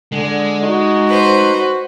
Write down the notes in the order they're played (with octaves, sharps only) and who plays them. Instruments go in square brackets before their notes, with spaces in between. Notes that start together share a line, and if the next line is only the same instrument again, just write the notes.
[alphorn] D3 [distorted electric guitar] G#3
[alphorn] D#4 [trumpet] F#4
[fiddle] B4 C5